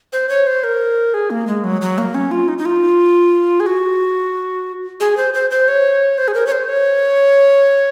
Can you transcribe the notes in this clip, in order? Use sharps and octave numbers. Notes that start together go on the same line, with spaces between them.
C5
C#5
C5
A#4
G#4
A#3
G#3
F#3
F#3
A#3
C#4
F4
D#4
D#4
F4
G#4
F#4
G#4
C5
C5
C5
C#5
C5
G#4
A#4
C#5
C5
C#5